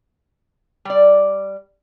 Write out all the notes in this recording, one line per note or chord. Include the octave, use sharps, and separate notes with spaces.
G3 D5